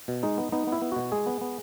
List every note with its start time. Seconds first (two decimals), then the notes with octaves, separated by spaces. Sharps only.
0.08 B2
0.23 G#3 D#4
0.38 B3
0.52 B3 D#4
0.67 B3
0.72 E4
0.82 B3
0.92 B2 F#4
1.12 G#3 G#4
1.26 B3
1.41 B3